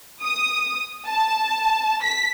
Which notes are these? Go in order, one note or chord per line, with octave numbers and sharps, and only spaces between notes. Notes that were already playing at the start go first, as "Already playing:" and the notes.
D#6
A5
B6